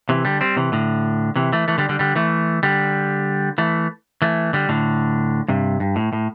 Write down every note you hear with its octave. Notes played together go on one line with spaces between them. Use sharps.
C3 E3
D3 G3
G3 C4
C3 E3
A2 D3
C3 E3
E3 A3
E3 A3
D3 G3
D3 G3
D3 G3
E3 A3
D3 G3
E3 A3
E3 A3
D3 G3
A2 D3
G2 C3
G2
A2
A2